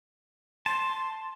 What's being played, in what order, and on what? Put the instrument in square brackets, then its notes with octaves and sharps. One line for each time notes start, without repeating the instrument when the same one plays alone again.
[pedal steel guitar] A5 [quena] C6